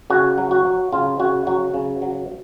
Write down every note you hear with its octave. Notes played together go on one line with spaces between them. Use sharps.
C#3 F#4
F#3
F#4
F#3
C#3 F4
C#3 F#4
F#3 F#4
C#3
F#3